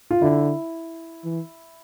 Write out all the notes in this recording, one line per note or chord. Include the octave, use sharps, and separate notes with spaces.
F4
D3 E4
E3